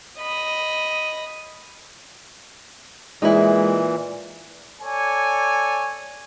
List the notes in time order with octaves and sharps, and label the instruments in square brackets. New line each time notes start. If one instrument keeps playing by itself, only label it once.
[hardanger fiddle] D#5 B5
[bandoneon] A#2 E3 [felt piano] G#3 [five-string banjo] D#4 E4
[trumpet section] A4 C#5 D5 G#5